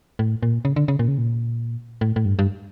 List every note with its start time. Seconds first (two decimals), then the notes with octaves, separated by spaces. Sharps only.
0.19 A2
0.43 A#2
0.65 C#3
0.76 D3
0.88 C#3
0.99 A#2
1.08 C#3
1.18 A#2
2.01 A2
2.16 A2
2.25 G2
2.39 G2